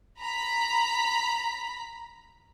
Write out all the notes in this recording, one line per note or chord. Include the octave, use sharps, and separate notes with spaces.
A#5 B5 B6